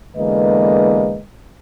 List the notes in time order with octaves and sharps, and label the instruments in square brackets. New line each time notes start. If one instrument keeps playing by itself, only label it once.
[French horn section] E2 D3 G#3 A#3 B4 D#5